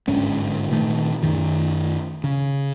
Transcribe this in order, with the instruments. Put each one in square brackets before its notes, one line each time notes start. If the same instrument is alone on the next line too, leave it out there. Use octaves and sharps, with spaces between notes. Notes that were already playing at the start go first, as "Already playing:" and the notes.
[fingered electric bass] G1 G#2 D3 C#4
A#2 D#3 A3
F#2 D#3
C#3